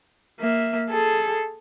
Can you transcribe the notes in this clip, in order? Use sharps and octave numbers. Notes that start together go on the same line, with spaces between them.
A#3 E5
G#4 A4